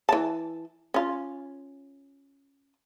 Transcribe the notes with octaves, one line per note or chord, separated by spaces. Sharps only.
E3 A5
C#4 F4